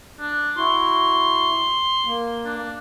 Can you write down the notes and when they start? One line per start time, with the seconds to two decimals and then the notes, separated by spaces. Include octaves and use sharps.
0.20 D4
0.57 E4 F#4 C6
2.05 A#3
2.45 D4